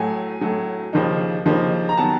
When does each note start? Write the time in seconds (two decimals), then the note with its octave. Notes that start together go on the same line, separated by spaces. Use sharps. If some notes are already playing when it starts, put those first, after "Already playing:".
Already playing: A2 F#3 A3 G#5
0.41 A2 F#3 A3
0.93 D#2 C#3 F3 A#3 D#4
1.45 D#2 C#3 F3 A#3 D#4
1.89 A#5
1.97 D#3 F#3 B3 A5